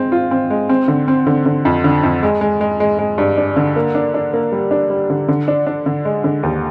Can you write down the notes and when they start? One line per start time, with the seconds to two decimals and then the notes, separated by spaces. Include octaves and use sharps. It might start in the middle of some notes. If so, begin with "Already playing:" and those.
Already playing: G#3 C4
0.12 F4
0.31 C4
0.50 G#3
0.69 C4
0.88 D3
1.08 C4
1.27 D3
1.46 D3
1.65 F2
1.84 D3
2.03 F2
2.23 G#3
2.41 G#3
2.61 G#3
2.80 G#3
2.99 G#3
3.18 G2
3.37 D4
3.56 D3
3.76 A#3
3.95 D4
4.14 D4
4.33 A#3
4.52 G3
4.71 D4
4.90 G3
5.10 D3
5.29 D3
5.48 D4
5.67 D4
5.86 D3
6.05 G#3
6.24 D3
6.43 D#2